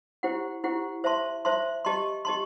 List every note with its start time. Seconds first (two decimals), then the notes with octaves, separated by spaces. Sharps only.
0.23 E4 G4 C5 F#5
0.64 E4 G4 C5 F#5
1.04 C5 E5 A5 C6
1.45 C5 E5 A5 C6
1.85 G4 D#5 A5 C6
2.25 G4 D#5 A5 C6